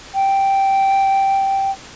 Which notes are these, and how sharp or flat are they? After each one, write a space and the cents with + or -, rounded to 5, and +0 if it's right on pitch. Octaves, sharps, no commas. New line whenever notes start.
G5 -5